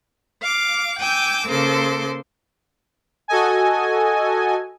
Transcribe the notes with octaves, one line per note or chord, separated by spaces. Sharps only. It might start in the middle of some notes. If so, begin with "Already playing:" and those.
F5 D6
G5 G#5 D6 E6 G6
C#3 A#3 A4 C5 C6 D6
F#4 A4 D#5 G#5